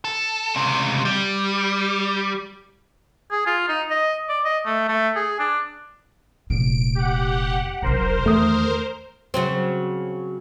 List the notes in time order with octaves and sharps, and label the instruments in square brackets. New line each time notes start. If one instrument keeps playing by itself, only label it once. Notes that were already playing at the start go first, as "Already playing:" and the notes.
[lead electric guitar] A4
C#2 C3
G3
[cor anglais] G#4
F4
D#4
D#5
D5
D#5
A3
A3
G#4
D4
[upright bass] F1 A#2 [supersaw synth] D7
[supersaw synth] G4 F#5
[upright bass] E1 B1 [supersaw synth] A#4 C5
[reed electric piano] E2 A3 D#6 [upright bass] D#3
[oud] C#3 F#3 C4